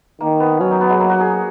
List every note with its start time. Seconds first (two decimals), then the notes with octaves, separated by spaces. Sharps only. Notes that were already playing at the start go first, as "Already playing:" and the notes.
0.21 D#3 A#3
0.40 B3
0.60 F#3 C#4
0.70 D#4
0.81 B3
0.90 G#3
1.00 A#3
1.10 F#4
1.20 G#4